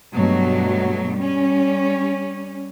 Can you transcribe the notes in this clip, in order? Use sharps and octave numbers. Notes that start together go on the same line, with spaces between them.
G2 B2 F#3 A3
G3 C#4